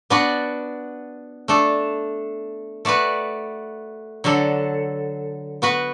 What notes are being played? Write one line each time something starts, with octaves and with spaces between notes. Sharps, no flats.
B3 D4 F#4 B4 D5
A3 D4 A4
A3 F#4 B4 D5
D3 F#3 D4 A4
B3 F#4 B4